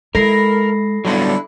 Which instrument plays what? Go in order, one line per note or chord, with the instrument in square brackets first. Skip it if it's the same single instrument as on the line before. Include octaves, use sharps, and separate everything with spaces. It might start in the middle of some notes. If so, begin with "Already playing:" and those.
[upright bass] G#3 [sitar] E4 [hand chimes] A4 A#6 C7 [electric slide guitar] A#4
[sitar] D3 D4 E4 [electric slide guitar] F#3 G3 B3